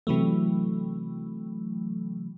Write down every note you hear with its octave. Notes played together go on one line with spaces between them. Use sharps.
C3 E3 F#3 A3